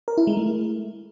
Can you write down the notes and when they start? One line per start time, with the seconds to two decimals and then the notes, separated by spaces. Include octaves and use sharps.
0.08 A#4
0.17 E4
0.27 G#3
0.37 A3